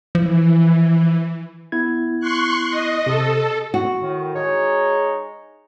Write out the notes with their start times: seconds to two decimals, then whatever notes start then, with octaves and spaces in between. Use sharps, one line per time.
0.15 E3 F3
1.72 B3 E4 G#6
2.20 C6 C#6 F#6
2.70 D#5
3.06 C3 A4
3.74 F#4
4.01 A2 D#3
4.34 G#3 D#4 C#5